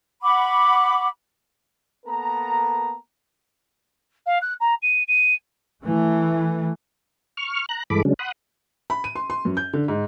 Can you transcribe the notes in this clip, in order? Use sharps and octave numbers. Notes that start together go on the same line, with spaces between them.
F#5 B5 C#6 D6
A#3 B3 A4 A#4 A5 A#5
F5
F#6
A#5
D#7
D#7
E3 A3
C#6 F6
A#5 F#6
G2 E3 G#3 A4 B5 D6
C#3 F#3 G#3 C#4 D4
F#5 B5 C6 D#6 F#6
B5
D#7
C6
C6
F#2
G6
D3
G#2